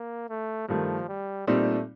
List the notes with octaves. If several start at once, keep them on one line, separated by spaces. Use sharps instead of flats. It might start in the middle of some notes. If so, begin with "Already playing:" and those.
Already playing: A#3
A3
G2 D#3 F3 A3
G3
A#2 G3 A3 C4 D#4